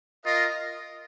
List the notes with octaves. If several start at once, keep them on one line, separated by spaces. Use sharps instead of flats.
F4 A#4 D#5